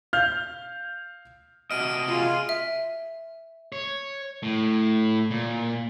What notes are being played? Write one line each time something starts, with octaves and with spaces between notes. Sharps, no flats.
F5 F6 G6
C3 F#4 D#5 F6 D7 D#7
F4 G#4
E5
C#5
A2
A#2